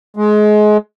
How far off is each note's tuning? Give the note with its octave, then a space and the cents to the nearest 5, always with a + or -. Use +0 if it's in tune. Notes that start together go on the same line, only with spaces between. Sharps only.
G#3 +25